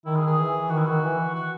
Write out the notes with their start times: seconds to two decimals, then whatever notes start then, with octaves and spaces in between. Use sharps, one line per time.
0.05 D#3 E4
0.16 G#4
0.21 D#3
0.26 G#4
0.38 E3
0.69 D#3 F#4
0.78 E4
0.86 D#3 F#4
1.02 E3
1.35 F#4